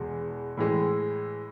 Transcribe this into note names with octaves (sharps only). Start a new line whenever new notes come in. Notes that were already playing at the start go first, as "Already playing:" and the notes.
Already playing: E2 B2 G#3
A2 E3 G#3